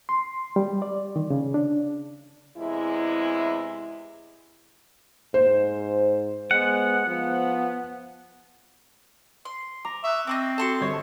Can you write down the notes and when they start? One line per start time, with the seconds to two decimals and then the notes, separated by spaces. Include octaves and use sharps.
0.09 C6
0.56 G3
0.82 D5
1.16 D#3
1.30 C#3
1.54 D4
2.57 E2 C3 G#3 E4
5.34 G#2 C5
6.51 G#3 B3 F#5
7.07 F3 B3
9.45 C6
9.85 A#5 D6
10.04 E5 C#6 D#6 F#6
10.27 C4 D#5 B5 D6
10.58 F#4 A4 A5 C6 C#6
10.80 G1 C#5